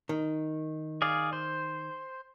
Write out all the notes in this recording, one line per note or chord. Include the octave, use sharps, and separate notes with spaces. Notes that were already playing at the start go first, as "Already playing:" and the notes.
D#3
G#4 D5 F5
C5